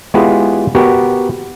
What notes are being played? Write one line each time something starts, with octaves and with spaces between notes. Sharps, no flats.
G#3 B3 E4 F4 G4 G#4
B3 F#4 G4 A#4